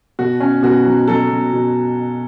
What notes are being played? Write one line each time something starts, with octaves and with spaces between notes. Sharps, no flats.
B2 F#4
C#4
B2 F#4
F#3
F#3 A4
B2
B2